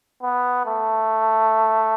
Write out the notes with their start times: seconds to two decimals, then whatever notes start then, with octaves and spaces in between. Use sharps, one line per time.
0.23 B3
0.66 A3